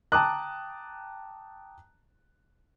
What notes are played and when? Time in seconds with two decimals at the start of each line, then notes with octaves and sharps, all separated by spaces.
0.12 G5 A5 A#5 D6 D#6 F#6